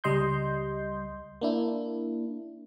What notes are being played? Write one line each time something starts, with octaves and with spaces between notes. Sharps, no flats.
C#2 G3 D#5 C6 G6
A#3 D4 E4